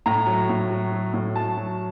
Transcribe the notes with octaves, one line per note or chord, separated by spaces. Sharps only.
A2 A#5
F#3
A2
F#3
F#3
A2
F#3 A5
F#3